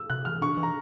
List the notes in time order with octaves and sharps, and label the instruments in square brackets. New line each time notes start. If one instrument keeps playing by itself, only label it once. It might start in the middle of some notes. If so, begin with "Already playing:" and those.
Already playing: [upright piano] E6
[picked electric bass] C3 [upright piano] F#6
[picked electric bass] E3 [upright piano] F6
[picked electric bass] D4 [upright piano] C#6
[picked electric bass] E3
[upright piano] A#5